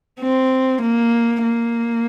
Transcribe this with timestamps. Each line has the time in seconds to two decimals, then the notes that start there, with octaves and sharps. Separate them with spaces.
0.20 C4
0.81 A#3
1.43 A#3